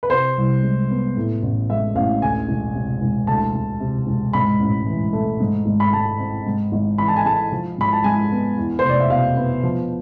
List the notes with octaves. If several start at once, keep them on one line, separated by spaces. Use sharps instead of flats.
B4
C3 C5
C2
G#3
B3
A2
A1
G#3 E5
A1 F5
D2 G#5
E1
C3
E1
D2 A5
E1
C3
E1
G#2 B5
A1
E3
A3
G#2
G#1
B5
G#3 A5
C4
G#2
G#1
E3 B5
A5
G#5
G#3 A5
F3
G#2 B5
A5
G#3 G#5
B3
E2
F1 C5
D5
E5
B2 F5
B3
F3